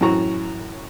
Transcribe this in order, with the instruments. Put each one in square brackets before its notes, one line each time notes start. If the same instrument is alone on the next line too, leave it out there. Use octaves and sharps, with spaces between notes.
[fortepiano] F#2 A2 E3 F#4 A#5 C#6